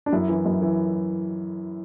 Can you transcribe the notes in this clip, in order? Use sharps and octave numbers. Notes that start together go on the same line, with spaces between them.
D4
F#2 E4
E3
F#2
E3